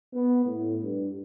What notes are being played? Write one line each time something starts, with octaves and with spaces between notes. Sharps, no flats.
B3
A2
G2